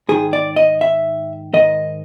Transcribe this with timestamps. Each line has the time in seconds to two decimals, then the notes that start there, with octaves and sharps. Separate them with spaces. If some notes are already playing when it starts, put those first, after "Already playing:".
0.09 G#2 D#3 G#4
0.33 D5
0.56 D#5
0.81 E5
1.53 G#2 D#3 D#5